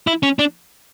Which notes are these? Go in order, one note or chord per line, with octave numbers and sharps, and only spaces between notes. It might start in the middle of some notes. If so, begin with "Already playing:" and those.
E4
C#4
D4